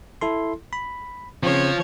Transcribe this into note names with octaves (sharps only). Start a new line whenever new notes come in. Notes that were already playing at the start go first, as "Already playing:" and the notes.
E4 A4 C6
B5
C#3 F3 C4 C#5